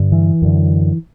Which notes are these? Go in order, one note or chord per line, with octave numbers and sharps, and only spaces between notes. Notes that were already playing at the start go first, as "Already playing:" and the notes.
Already playing: G2 D3
E3
F#2 D3